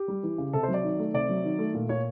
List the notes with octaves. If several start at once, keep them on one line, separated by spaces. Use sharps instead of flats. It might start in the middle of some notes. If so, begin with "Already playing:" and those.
Already playing: G4
G3
E3
C#3
C3 A4
C5
F#3
D5
D#3
A3
C3 D5
F#3
D#3
A3
A#2
A#2 C#5